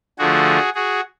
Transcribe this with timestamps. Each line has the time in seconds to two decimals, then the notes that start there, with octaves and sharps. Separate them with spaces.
0.18 D3 F3 A3 F#4 G#4
0.75 F#4 G#4